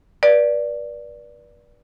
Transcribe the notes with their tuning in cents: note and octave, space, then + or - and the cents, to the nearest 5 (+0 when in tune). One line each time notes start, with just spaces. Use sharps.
B4 -40 D5 +0